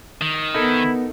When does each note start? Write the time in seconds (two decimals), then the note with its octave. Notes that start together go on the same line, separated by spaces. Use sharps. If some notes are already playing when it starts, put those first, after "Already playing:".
0.21 D#3
0.55 B3 D#4 E4 A4 A#4